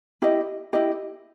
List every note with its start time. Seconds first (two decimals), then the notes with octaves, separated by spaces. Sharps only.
0.22 E4 G4 D#5
0.73 E4 G4 D#5